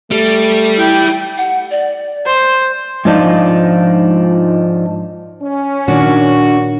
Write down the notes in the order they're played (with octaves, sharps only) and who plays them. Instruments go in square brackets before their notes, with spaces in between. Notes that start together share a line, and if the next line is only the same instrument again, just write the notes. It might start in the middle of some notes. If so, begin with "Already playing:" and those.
[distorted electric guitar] G3 [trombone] A3
[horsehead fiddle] E4 G5
[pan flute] F#5
D5
[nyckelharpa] C5
[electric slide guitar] G#2 F3 D4 D#4 F4
[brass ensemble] C#4
[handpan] A#2 D#3 [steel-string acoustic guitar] D4 [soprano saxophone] F#4